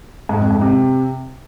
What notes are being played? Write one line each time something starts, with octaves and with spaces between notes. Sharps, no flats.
G#2
F2
G#2
C3